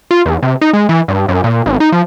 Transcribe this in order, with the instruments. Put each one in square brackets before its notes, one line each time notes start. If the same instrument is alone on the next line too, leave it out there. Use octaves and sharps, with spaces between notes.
[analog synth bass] F4
E2
C3
D#4
G#3
E3
G2
F#2
A#2
G#1
D#4
F3